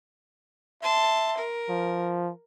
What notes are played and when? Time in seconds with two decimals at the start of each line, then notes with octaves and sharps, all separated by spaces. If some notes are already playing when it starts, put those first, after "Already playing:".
0.82 E5 A5 C6
1.37 A#4
1.69 F3